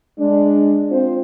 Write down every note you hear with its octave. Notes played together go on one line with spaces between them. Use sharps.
G#3 D4
C4 F4 C5